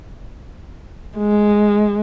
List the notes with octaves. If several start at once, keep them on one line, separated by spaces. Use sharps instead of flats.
G#3